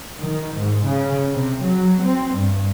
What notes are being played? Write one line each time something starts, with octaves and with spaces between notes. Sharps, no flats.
D#3
G#2
C#3
C3
F#3
C4
G2